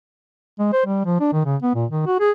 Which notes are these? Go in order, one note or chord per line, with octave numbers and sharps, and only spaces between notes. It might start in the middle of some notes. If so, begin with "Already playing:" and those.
G#3
C5
G3
F3
D4
D#3
C#3
B3
A#2
D#3
F#4
G#4